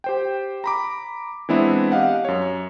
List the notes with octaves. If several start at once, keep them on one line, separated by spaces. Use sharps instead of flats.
G4 C5 G5
A#5 B5 D6
E3 G#3 B3 C4 D4 E4
G4 D#5 F5 F#5
F#2 C#5